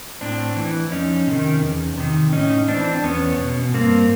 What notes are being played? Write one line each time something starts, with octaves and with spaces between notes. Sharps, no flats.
A2 C4 D4
E3
F2 C#4 D#4
C3 D#3
E2
C3 D#3
A2 C#4 D#4
E3 C4 D4
E2 B3 C#4
B2
G2 A#3 C4